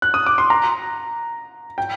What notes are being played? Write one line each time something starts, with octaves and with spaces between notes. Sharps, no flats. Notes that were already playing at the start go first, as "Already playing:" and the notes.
F#6
D#6
D6
C6
A#5
G5